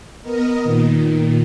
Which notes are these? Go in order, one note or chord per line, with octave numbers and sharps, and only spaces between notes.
B3 A#4 D#5
A#2 D#3